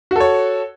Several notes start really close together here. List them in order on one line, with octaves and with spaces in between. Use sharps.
F#4 A4 C#5